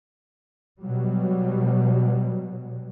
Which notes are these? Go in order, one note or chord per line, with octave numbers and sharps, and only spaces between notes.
B2 F#3 G3